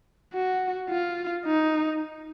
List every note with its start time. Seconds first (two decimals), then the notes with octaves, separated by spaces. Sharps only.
0.33 F#4
0.89 F4
1.45 D#4